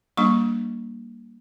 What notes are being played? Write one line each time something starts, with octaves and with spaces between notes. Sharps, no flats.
G3 A#3 D4 C#6